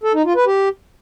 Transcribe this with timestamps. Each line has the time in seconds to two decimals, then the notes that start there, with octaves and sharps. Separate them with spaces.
0.04 A4
0.14 D#4
0.25 F4
0.36 B4
0.46 G4